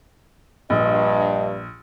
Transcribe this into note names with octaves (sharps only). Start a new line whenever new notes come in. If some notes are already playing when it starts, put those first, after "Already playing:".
A#1 G2 D#5